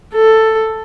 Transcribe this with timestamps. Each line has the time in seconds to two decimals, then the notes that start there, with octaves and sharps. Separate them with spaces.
0.14 A4